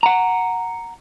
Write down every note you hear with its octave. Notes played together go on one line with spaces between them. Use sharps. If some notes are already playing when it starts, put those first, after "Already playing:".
F#5 A#5